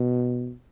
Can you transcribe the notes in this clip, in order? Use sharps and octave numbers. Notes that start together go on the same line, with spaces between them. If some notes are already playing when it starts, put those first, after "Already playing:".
Already playing: B2